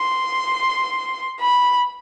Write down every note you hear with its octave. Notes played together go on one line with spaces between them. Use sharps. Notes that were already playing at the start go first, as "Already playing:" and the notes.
Already playing: C6
B5